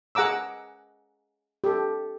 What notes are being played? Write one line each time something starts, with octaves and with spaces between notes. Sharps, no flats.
G#4 F#5 A#5 D6 E6
G4 A4